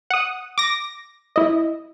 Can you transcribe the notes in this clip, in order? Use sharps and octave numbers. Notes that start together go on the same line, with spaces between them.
F#5 D#6
D6 A#6
E4 D#5